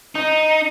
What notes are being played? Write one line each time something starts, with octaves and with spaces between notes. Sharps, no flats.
D#4